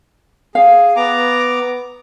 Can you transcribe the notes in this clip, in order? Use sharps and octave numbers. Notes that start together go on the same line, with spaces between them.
G#4 F5
B3 A#5 D6